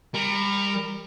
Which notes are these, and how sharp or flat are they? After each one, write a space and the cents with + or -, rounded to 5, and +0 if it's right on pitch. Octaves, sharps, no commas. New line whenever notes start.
G3 +30 A#4 +0